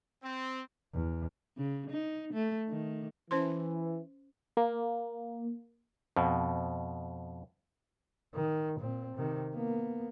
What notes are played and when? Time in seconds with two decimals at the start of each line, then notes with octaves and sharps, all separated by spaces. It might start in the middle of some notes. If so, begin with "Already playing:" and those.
0.23 C4
0.94 E2
1.57 C#3
1.90 D#4
2.33 A3
2.69 D#3
3.31 E3 C#4 C5 C6
4.57 A#3
6.16 F2 B2
8.34 D#3
8.79 A#2 C4
9.15 C3 D#3
9.54 A#3 B3